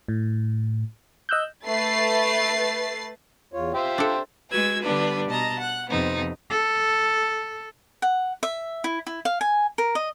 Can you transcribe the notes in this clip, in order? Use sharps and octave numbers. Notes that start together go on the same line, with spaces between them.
A2
D#5 E6 F#6 G6
A3 B4 A6 C7
E2 F4 C#5
F4 G4 C5 E5
D4 A4
G#3 F#4 B4 E6 G#6
D3 G3 B3 D4 B4
B2 D#5 A5 A#5
F#5 F#6
F2 C3 B3 C4 D#4
A4
F#5
E5
E4
E4
F5
G#5
A#4
D#5